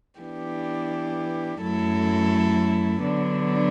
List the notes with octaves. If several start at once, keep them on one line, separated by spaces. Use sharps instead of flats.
E3 B3 D4 G4
F#2 F#3 A3 E4 A4
D3 F#3 B3 D4